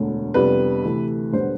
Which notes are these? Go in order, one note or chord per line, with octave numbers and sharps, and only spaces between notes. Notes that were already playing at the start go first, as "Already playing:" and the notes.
Already playing: E1 D2 D3
F2 C3 G3 B3 D4 B4
D2 C3 E3 A3
E1 D3 G3 B3 C5